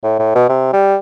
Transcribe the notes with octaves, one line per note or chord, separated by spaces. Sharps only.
A2
A2
B2
C3
G3